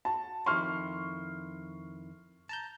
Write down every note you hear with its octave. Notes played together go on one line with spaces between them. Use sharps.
F#4 A5
F2 D#3 E4 C6 C#6 F6
A5 A#5 G6